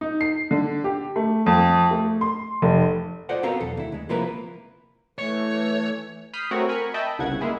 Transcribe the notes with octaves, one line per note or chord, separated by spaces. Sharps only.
D#4
C7
D3
G4
A3
F2
A3
C6
F1
F4 A4 C5 D5 D#5 F#5
B3 C4 F#4 A#4 F5 A#5
B1 E2 A4
D2 E4
D2 G#3
C3 F3 A#3 E4 A#4 B4
E3 A3 C#5
B5 D#6 F6 G6 B6 C7
A3 C4 F#4 A#4 C#5 F#5
A#4 G#5 B5 C#6
D#5 E5 G5 A5 B5
G1 C2 C#3 F#5 G#6
G#3 A#3 E4 G#4